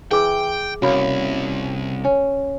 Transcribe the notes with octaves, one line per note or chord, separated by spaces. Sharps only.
E3 E4 G#4 G5 D6
C2 C#3 A#3 F#4 B5
C#4